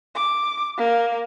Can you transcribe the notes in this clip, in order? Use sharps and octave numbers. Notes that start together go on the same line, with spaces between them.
D6
A#3